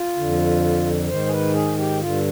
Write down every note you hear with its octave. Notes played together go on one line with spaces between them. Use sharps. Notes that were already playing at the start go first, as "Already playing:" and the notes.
Already playing: F4
F2 D3
G#2 D#3 C5
G#4
B4
G#4
G4
G2 D3 F4